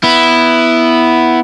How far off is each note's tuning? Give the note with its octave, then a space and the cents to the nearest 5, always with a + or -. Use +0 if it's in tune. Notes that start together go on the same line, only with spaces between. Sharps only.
B3 +0 E4 +0